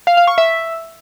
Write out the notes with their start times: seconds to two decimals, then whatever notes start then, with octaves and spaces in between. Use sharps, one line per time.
0.07 F5
0.17 F5
0.27 C#6
0.38 E5